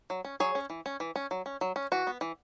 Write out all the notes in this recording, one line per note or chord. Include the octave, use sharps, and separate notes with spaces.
F#3
C#4
F#3 G#4 C#5
C#4
E3
C#4
E3
C#4
F#3
C#4
F#3
C#4
E3 F#4
B3
E3